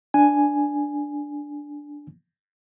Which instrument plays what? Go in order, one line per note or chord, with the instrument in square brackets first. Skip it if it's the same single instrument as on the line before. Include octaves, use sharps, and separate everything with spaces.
[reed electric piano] D4 G#5